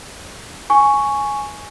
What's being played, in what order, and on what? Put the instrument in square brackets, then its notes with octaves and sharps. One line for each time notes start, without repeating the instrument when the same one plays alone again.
[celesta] G#5 C#6